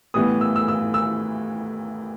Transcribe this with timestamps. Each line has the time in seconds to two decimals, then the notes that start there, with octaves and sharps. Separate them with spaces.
0.14 A2 E3 G3 B3 D#6
0.41 E6
0.56 E6
0.68 E6
0.94 E6